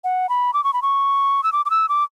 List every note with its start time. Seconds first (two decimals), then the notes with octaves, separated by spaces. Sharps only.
0.04 F#5
0.29 B5
0.53 D6
0.64 C#6
0.73 B5
0.82 C#6
1.43 E6
1.52 D6
1.65 D6
1.70 E6
1.89 D6